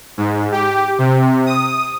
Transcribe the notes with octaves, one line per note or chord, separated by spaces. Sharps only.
G#2
G4
C3
D#6